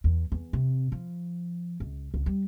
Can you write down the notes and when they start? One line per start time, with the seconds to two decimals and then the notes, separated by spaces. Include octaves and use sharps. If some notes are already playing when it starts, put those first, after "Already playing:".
0.04 E2
0.32 E2
0.53 C3
0.92 F3
1.80 C#2
2.14 C#2
2.26 G3